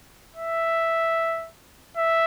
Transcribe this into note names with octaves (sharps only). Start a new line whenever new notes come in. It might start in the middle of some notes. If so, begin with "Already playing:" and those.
E5
E5